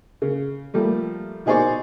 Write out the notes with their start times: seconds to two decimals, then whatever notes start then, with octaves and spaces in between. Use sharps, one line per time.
0.22 C#3
0.74 F3 G3 A3 A#3
1.46 B2 D#4 G#4 C5 D5 C#6